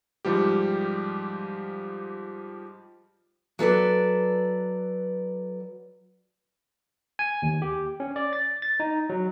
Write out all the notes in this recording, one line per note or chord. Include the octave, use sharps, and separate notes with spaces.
G#2 F3 G3 G4
F#3 A4 B4 D5
G#5
D#2
G4
C#4
D5
A6
A6
D#4
F#3